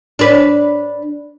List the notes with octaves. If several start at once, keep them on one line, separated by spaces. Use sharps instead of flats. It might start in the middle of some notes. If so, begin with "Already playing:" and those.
D4 B4